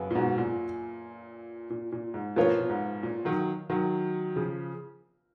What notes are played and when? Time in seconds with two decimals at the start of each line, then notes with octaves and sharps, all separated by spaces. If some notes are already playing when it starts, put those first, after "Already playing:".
Already playing: F#2 C#3 B3
0.11 A#2
0.15 G#2 B2
0.38 A#2
1.70 A#2
1.92 A#2
2.14 G#2
2.36 A#2 F3 B3 F4 A#4 C#5
2.59 A#2
2.70 G#2
3.03 A#2
3.25 D#3 F#3
3.70 D#3 F#3
4.36 C#3 F3